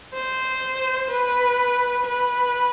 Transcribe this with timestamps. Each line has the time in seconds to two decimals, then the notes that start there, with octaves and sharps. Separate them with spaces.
0.14 C5
1.10 B4
2.06 B4